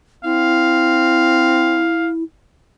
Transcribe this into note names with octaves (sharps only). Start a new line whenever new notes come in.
C4 E4 F5